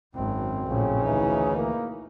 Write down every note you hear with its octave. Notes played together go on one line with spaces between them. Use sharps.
G#1 F#2 C4
A#1 A2 C#3
D2 E3 D#4 E4
A#3